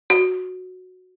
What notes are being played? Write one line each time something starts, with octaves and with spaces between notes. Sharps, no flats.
F#4